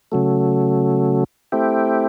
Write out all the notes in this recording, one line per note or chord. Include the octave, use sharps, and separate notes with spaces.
C#3 F#3 A3
A3 C4 E4 G4